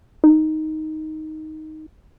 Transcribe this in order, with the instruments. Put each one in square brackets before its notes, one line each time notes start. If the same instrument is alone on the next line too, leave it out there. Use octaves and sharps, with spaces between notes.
[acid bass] D#4